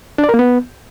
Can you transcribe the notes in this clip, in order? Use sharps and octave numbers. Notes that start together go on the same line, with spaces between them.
D4
D5
A#4
A#3
B3